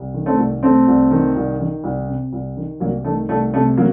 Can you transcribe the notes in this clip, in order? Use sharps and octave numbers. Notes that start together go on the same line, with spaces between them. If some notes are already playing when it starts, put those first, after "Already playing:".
Already playing: C2
D#3
A3 C4
C2
C3 A3 C4
C2
D#3
C2
D#3
C2
C3
C2
D#3
C2 F#3 A#3
D#3 A3
C2 A3
C3 A3
F#3 A#3